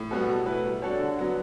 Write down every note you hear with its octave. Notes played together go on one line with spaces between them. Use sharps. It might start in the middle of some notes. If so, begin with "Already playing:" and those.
Already playing: A2
G3 B3 F#4 A4
B2
A3 E4 B4
G3
D4 F#4 A4 C#5
D3
F#3 B3